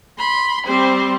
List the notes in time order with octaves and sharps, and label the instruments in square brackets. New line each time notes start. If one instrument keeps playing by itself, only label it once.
[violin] B5 [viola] C6
[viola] G3 C4 [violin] C5